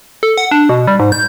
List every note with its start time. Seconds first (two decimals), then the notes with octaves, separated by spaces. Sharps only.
0.23 A4
0.38 F#5
0.51 D4
0.69 B2
0.87 G3
1.00 G#2
1.12 G6